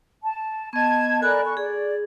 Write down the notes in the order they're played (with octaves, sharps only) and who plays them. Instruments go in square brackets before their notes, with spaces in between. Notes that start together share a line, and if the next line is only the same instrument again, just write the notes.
[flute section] A5
[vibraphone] B3 D#5 [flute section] A5 G#6
[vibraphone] A4 G#5 B5 [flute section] A#4 D5 F#6
[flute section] C#6
[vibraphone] G#4 [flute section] D5